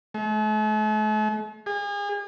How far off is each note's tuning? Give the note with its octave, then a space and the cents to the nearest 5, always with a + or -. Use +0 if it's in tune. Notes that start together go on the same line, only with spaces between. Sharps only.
A3 -45
G#4 -35